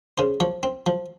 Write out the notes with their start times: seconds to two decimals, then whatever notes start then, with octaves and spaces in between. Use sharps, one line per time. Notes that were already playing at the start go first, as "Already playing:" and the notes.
0.18 C#3 C5
0.40 F3 C#5
0.63 C4
0.86 F3